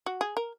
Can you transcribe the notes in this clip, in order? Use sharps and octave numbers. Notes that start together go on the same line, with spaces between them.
F#4
G#4
A#4